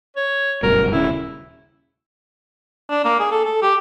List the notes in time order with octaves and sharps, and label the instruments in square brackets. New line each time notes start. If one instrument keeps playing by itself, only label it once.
[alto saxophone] C#5
[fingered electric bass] F#1 G2 B2 [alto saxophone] A#4
[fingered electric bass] D#1 C#3 [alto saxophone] E4
[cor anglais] D4
A#3
G#4
A4
A4
G4